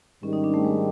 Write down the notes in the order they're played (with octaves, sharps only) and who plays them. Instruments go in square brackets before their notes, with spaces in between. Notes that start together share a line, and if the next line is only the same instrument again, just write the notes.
[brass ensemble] G#2 D#3 G3 [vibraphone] C#4
[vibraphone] D#4
D4
A3
G#3